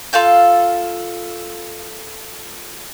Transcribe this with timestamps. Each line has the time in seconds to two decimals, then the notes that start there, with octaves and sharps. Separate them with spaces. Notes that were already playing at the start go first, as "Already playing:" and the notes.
0.13 F4 A4 F5 G6